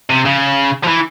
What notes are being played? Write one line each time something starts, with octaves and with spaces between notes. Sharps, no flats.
C3
C#3
F3
E3